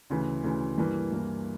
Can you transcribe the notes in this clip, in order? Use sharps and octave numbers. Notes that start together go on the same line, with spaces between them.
D2 C#3 E3
D2 C#3 E3
G2 E3 A#3
G2 E3 A#3